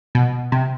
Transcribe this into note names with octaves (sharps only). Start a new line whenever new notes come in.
B2
C3